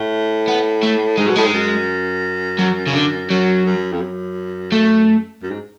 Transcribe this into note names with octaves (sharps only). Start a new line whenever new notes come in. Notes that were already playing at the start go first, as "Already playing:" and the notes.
Already playing: A2
B3
A3
G#2 G#3
B2 F#3
A2 G#3
G#2
F#2
F#3
C#3
D3
F#2 F#3
F#2
F2
F#2
A3
F#2
G#2